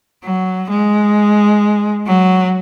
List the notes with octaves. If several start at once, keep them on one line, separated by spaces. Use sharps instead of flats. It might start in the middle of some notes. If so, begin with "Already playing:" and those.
F#3
G#3
F#3